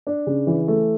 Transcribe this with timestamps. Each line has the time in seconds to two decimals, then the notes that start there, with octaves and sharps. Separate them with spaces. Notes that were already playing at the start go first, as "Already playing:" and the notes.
0.07 D4
0.27 C#3
0.47 E3
0.68 A3